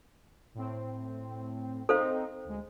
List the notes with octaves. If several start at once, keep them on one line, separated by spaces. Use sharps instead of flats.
A2 C4
C4 D#4 A4 C5 F5
D2 G#3